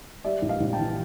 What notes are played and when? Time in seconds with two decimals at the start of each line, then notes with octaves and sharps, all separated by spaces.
0.24 G3 D5 E5
0.42 A#1
0.48 D#5 F5
0.60 A#1
0.73 G5 A5
0.79 E3